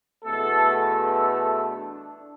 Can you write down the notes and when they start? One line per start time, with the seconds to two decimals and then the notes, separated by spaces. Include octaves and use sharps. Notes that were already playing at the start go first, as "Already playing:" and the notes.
0.23 E2 B2 A3 A4
0.72 A4
1.68 D4